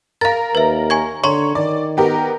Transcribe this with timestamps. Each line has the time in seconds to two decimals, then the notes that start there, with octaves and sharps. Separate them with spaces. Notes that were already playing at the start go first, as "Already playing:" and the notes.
0.21 A#4 F5 A#5 A6
0.55 D#2 B4 E5
0.90 G#5 C#6 G#6
1.24 D3 C#5 A#5 C6 C#6
1.55 D#3 D5
1.97 B3 G4 A#4